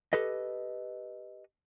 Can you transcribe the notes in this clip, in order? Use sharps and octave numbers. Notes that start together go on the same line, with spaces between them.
G4 A4 B4 D#5